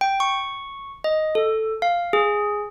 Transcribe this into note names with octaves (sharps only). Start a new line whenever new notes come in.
G5
C#6
D#5
A4
F5
G#4